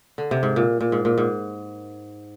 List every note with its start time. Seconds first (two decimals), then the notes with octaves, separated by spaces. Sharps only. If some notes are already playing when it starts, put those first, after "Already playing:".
0.18 D3
0.31 C3
0.43 G#2
0.56 A#2
0.81 A#2
0.92 G#2
1.05 A#2
1.18 G#2